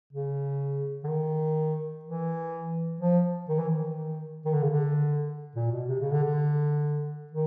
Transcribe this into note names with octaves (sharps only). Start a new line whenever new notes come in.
C#3
D3
D#3
E3
F3
D#3
E3
D#3
D#3
D3
C#3
D3
A#2
B2
C3
C#3
D3
D3
D#3